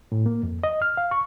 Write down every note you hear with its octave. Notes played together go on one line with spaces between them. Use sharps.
A2
A#3
F2
D#5
F6
F5
C#6